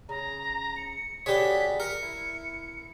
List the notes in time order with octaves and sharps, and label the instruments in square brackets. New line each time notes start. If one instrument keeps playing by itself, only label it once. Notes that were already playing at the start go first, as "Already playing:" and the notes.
[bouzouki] C#3 [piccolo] A#5
[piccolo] C#7
[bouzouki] B2 D3 G#4 [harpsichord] G4 C#5 [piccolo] B6
[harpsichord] A#4 [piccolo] C#7
[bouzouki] E4